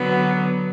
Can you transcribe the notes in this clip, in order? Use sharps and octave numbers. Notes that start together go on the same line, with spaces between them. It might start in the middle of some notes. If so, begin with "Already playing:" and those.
Already playing: D3 F#3 B3